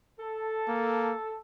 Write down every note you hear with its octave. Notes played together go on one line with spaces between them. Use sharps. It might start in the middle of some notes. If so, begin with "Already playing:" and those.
A4
A#3